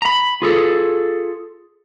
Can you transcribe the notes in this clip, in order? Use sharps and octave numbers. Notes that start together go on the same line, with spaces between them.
A#5 B5
F4 G#4 A4